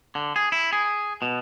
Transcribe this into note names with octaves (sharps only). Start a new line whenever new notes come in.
D3
G#4
E4
G#4
B2